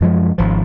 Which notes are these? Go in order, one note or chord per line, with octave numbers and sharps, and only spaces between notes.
F#2 F3 G#3
G#1 F3